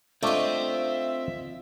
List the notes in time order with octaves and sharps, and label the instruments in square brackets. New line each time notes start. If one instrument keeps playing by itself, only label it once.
[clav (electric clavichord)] A3 D4 [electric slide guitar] C4 C5 [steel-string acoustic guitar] F4 D#5 [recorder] E5